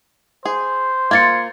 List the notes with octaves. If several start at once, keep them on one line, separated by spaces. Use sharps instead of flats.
G#4 C5
A#3 F4 G#6 A6 C#7